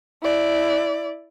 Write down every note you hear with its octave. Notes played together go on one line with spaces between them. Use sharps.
E4 D5